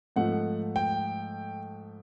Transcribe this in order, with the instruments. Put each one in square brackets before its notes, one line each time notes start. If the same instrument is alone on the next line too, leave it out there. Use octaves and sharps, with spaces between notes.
[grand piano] G#2 F3 A3 F#5
G5